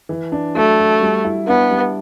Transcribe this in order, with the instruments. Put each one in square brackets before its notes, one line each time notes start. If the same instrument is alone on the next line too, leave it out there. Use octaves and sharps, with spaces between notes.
[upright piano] E3
D4
[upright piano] F#3 [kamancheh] A3
[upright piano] F#4
G3
E4
[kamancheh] B3 [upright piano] D4
[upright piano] G3